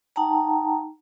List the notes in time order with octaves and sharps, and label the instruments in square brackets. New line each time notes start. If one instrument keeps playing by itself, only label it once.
[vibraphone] D#4 F#5 G5 A5 A#5